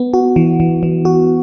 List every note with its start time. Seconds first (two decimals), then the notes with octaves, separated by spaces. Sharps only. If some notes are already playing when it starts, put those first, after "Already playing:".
Already playing: B3
0.14 F#4
0.36 E3
0.60 E3
0.83 E3
1.05 F#4